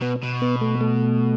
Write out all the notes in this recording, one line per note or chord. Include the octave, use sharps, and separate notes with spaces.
B2 B3
B2
B3
A3
A3